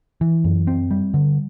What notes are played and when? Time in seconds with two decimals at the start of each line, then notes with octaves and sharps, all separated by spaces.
0.21 E3
0.44 F#2
0.67 C4
0.91 G3
1.14 D3